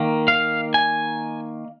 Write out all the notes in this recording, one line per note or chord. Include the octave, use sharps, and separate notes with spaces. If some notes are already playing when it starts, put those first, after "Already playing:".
Already playing: D#3 A#3
F5
G#5